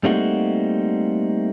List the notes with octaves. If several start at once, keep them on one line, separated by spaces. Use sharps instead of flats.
G3 A3 A#3 C4 D#4 F#4